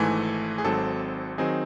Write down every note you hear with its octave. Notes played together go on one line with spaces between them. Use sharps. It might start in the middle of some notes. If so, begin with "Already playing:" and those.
Already playing: G#1 G#2 E3 A3 G#5
G#4
G#1 G#2 F#3 C4 A4
D#3 F#3 C4 D#4 G#4